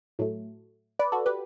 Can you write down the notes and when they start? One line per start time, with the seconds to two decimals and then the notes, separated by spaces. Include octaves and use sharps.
0.19 A2 F#3 A3
0.99 B4 D5
1.12 F#4 A4
1.26 G4 B4